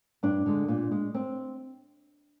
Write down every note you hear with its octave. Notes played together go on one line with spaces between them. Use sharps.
G2 D4
D3 G#3
A#2
G#3
C4